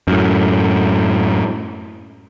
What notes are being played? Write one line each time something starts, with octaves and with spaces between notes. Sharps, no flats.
F#2 A2